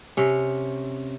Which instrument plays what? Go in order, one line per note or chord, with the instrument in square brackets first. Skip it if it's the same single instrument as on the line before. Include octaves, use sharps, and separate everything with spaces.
[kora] C3 C#4